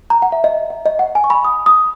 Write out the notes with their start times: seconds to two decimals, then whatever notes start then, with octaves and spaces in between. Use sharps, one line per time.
0.10 A#5
0.22 F#5
0.32 E5
0.44 D#5
0.70 D#5
0.86 D#5
0.99 F#5
1.15 G#5
1.24 C#6
1.30 B5
1.44 D#6
1.66 D#6